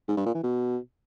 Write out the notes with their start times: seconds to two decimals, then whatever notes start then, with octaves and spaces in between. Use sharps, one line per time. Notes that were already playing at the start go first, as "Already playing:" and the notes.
0.08 G#2
0.17 G2
0.26 A#2
0.35 E3
0.43 B2